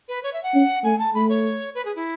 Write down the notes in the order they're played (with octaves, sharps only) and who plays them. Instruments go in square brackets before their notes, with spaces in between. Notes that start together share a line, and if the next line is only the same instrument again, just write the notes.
[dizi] B4
C#5
E5
F#5
[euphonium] C#4
[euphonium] A3 [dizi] G#5
[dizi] A5
[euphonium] A3 [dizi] B5
[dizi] C#5
B4
G#4
E4